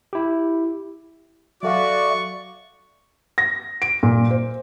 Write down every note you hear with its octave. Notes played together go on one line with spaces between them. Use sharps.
E4 G4
F#3 F#4 A4 D5 E5 F5 C#6
A#6
D7
A#2
C5